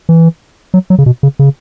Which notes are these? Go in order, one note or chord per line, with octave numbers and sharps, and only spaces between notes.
E3
F#3
F#3
C#3
B2
C#3
C#3